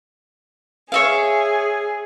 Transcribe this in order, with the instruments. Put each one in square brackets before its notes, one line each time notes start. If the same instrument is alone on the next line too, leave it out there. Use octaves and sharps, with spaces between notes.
[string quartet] G#4 [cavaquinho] C#5 E5 F5